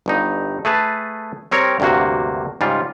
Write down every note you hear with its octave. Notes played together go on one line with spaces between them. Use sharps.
G1 G2 D#4
A3 G#4 B4 A5
G3 C4 A#4 C#5
D2 G2 C3 A#3 F#4
G#2 C#3 G3 F4